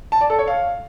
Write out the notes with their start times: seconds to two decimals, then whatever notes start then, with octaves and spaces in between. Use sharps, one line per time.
0.12 A5
0.21 D5
0.30 A4
0.39 C#5
0.48 F5